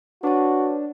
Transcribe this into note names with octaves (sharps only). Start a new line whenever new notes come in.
D4 F#4 B4 C#5 A5